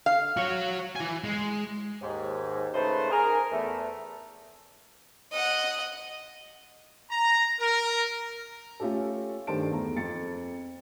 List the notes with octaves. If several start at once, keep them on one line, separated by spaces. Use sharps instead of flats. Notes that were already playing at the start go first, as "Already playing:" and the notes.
F5
F#4 C#5
E3 G#5
G#3
D#2 G#2
C#3 A3 D#4 B4 C5
G#4 A#4
E2 A3
D#5 F#5
A#5
A#4
A3 C#4 F4 G4 A4
G2 D#3 A3 C5 A5 D7
E2 A3 A#5
F2 A6 C#7